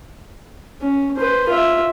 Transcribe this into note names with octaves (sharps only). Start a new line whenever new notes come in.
C#4
B4 C5
F4 E5